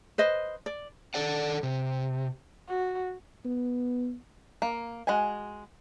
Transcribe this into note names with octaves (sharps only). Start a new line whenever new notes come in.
B4 C5 D#5
D5
D#3 A4 D5 F#5
C3
F#4
B3
A#3
G#3 F#4 G#5